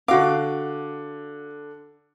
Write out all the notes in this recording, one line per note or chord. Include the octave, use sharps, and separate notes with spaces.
D3 F#4 F5 D6